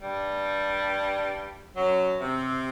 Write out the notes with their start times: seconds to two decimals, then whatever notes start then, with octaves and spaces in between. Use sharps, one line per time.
0.02 G2 G3
1.77 F#2 F#3
2.21 C3